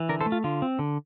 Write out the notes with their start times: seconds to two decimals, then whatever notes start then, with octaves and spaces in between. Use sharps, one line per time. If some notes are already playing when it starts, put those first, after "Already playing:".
Already playing: E3
0.09 D3 A#4 D5
0.21 A4 C5
0.26 A3
0.32 F4
0.44 D3 F4
0.62 C4
0.79 D3